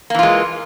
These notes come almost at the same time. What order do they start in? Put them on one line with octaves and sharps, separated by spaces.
A#3 E3 F4 G#3